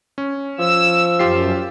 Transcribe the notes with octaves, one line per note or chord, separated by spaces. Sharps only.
C#4
F3 E6
F#2 F4 G4 C7